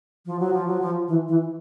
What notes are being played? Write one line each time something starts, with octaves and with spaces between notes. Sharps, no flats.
F3
F#3
F3
F#3
F3
E3
E3